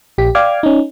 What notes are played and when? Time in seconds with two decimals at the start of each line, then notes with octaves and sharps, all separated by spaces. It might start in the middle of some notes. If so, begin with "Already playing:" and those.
0.18 A#1 G4 B6
0.35 D5 F5 G5 D6 F6 G#6
0.63 C#4 D#4